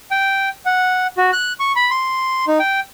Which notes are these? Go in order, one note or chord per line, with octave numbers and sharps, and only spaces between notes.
G5
F#5
F#4
F#6
C#6
B5
C6
D#4
G5